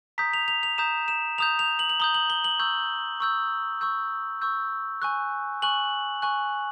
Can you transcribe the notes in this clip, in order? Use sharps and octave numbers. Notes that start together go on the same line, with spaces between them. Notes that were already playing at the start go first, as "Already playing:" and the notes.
A#5 D#6 G6 B6
F7
F7
F7
A#5 D#6 G6 E7
E7
A#5 D#6 G6 F7
F7
F#7
F#7
A#5 D#6 G6 G7
F#7
G7
F#7
C#6 E6 G6
C#6 E6 G6
C#6 E6 G6
C#6 E6 G6
G#5 C#6 F#6
G#5 C#6 F#6 F#7
G#5 C#6 F#6